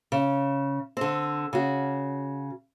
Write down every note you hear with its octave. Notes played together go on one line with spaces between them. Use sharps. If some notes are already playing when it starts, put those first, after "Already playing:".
C#3
D3 C4
C#3 F#4